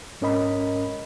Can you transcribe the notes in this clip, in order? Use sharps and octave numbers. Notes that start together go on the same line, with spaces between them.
G#2 C#4 A#4 D#5 B5